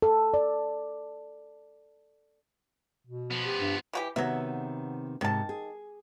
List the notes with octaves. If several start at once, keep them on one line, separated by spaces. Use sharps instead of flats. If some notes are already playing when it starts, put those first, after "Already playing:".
A4
D5
B2
F3 B3
G4
G2
E3 F#4 G4
C3 D#3 F#3 B3 E5
G#2 C3 D#3 A5
G#4